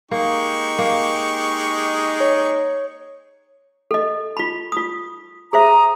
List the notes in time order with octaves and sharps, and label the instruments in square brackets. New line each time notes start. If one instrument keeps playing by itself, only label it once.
[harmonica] G#3 G4 C#6 [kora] A#3 [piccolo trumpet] D#4
[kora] A#3
[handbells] C#5
[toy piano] A4 D#5
F4 B5
F4 D#6
[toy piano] G#4 C5 E5 [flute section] G#5 A#5 D#6